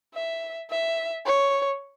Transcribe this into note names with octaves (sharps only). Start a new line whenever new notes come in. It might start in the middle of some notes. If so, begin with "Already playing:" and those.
E5
E5
C#5